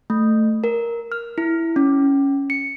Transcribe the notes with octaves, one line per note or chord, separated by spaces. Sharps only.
A3
A#4
F6
E4
C#4
C#7